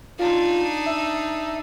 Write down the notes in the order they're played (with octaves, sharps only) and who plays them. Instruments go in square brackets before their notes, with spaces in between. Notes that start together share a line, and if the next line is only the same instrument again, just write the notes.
[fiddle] D4 D#4 [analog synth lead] F4
[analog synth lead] E5